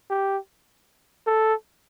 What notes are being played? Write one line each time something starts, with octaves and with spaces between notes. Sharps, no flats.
G4
A4